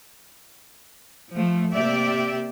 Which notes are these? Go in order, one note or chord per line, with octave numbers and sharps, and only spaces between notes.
F3 A3
C3 A#3 G4 D5 E5